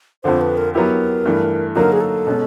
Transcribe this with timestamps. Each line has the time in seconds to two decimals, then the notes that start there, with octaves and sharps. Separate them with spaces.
0.24 F2 D3 F3 C5
0.41 B4
0.57 A#4
0.74 F#3 B3 E4 G4 A#4
1.26 G2 E3 A3
1.75 D3 F#3 A#3 D#4 F#4 A#4
1.92 G#4
2.01 A4
2.27 B2 G#3 C#4